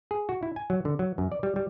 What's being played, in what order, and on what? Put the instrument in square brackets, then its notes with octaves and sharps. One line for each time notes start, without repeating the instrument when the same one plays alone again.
[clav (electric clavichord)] G#4
F#4
E4
G#5
F#3
D3
F#3
F#2
D5
G3
G3